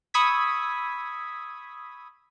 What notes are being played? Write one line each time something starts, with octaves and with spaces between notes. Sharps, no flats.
B5 C#6 D#6 E6 G#6 B6